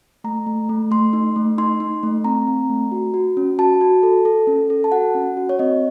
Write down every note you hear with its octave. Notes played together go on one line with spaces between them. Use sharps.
A3 A#5
A3
A3
A3 C6
D#4
A3
D#4 C6
D#4
A3
C4 A#5
C4
A3
F#4
F#4
C#4
F#4 A5
F#4
A4
A4
C#4
A4
A5
F#4 F#5
C#4
F#4
C#5
C4 D#5